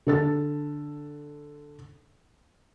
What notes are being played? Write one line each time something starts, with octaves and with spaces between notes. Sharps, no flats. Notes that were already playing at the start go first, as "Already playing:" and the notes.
D3 A4 A6